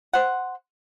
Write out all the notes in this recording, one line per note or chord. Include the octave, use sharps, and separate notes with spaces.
C5 F#5